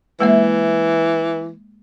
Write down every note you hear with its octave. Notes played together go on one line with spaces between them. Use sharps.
E3 G#3 A#3 E5